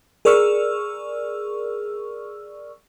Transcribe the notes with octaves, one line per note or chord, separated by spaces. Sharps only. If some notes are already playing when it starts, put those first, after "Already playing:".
G#4 A#4 D5 C#6 E6 F6